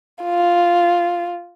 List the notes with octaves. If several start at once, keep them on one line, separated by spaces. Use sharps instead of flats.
F4